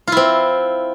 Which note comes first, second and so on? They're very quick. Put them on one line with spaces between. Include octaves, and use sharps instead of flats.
F4 E4 C4